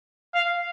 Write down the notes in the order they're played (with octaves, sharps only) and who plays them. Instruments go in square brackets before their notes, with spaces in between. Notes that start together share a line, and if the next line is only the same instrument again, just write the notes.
[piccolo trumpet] F5